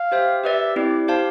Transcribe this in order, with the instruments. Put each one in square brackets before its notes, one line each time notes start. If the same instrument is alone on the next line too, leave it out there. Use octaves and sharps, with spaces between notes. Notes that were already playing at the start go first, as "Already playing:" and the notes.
Already playing: [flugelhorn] F5
[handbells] G4 C5 E5 G5
[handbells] G4 B4 D5 [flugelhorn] E5
[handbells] C4 E4 G4 [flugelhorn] D5
[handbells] G4 C5 F5 A5